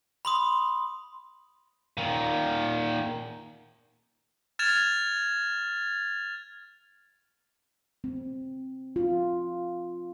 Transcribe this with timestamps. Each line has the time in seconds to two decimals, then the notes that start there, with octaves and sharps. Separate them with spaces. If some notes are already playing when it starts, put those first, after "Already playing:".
0.25 B5 C6 D#6
1.97 A#2 D#3
4.59 F6 G#6 A6 E7 F7
8.04 C4
8.96 F4